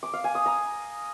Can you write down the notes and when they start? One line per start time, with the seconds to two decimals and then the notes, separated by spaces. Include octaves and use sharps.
0.03 D6
0.13 F5
0.24 G#5
0.35 D#6
0.46 A#5